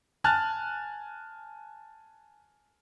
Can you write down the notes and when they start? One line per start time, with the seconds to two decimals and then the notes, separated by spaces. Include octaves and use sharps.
0.24 G#5 A5 F6 F#6 A6